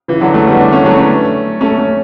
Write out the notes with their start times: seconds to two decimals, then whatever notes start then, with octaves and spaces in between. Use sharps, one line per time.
0.08 C#3 E3
0.21 D3 F#3
0.34 F#3 A3
0.47 G3 B3
0.59 B3 D4
0.72 A3 C#4
0.85 F#3 A3
0.97 A3 C#4
1.61 A3 C#4
1.78 A3 C#4